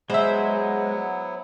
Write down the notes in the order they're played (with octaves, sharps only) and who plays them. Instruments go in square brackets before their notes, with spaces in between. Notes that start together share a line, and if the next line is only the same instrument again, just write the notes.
[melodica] F#3 B3 E4 [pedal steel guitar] G#3 [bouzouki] C5 E5